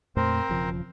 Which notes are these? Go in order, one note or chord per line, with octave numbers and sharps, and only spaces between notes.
F2 A#2 A3 C4 A#4 C5
E1 C#3 F3